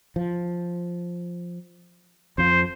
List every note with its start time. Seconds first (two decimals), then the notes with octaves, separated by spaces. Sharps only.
0.16 F3
2.38 F2 F3 C5